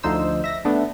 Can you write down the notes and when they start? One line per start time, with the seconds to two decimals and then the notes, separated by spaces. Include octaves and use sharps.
0.03 D2 D3 F3 D#4 C5 E6
0.44 E5 A#6
0.65 A3 B3 D4